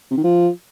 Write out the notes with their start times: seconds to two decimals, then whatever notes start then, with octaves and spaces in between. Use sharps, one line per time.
0.11 C3
0.17 D#3
0.24 F3